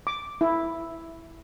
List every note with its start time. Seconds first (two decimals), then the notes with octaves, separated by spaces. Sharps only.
0.07 D6
0.41 E4